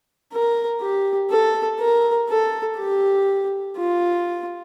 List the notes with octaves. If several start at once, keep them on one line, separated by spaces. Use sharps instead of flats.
A#4
G4
A4
A#4
A4
G4
F4